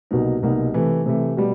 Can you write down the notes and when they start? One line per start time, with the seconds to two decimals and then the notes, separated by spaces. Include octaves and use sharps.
0.11 C2 B2 F#3 A#3 D#4
0.43 C2 B2 F#3 A#3 D#4
0.74 C3 E3 A3
1.06 C3 E3 A3
1.37 B2 G3